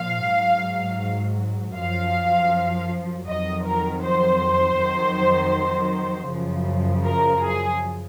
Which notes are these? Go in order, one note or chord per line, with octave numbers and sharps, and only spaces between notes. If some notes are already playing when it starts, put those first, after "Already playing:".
Already playing: A#2 F3 F5
G#2 F#3
F#2 F3 F5
F2 D#3 F#3 D#5
A#4
C5
F2 D#3 F#3
F#2 C#3 F3
A#4
G#4